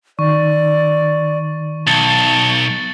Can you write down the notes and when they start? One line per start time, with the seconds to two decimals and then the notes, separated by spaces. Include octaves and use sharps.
0.19 D#3 D5 C#6
1.87 B1 A5 A6 C#7 F#7